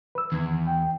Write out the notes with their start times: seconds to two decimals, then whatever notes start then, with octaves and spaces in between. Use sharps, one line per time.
0.15 B4 E6
0.32 E2 D#3 G#6
0.67 G5